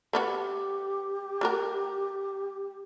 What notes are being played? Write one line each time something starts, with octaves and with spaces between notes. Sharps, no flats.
A3 B3 F#4 G4
A3 F#4 A#4